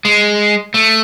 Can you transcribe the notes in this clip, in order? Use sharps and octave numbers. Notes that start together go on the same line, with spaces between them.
G#3
A3